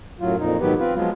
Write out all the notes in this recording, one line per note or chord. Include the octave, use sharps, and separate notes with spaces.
F#2 A2 F#3 F4
F2 A#2 D#4
G#2 D#3 F#3 B3 G4 B4
C4 F4 B4
F3 F#3 G#3 B3 F4